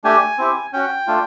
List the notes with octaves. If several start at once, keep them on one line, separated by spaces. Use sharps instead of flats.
A3 D4 G4 G#5
C4 E4 G4
C#4 F#4 G5
A3 D4 F4